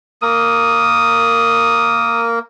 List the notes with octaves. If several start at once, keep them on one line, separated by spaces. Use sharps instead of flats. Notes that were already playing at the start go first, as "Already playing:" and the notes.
A#3 A#4 D#6